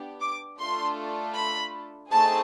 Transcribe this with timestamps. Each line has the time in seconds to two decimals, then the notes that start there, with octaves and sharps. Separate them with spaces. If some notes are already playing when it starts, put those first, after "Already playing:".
Already playing: B3 D4 G4
0.21 D6
0.59 A3 D4 F4 A4 C6
1.35 B5
2.11 A3 C4 D#4 G#4 A5